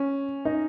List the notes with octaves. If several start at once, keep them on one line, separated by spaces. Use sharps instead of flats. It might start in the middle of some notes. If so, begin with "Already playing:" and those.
Already playing: C#4
D#4